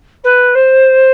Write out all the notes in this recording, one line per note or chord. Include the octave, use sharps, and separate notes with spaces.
B4
C5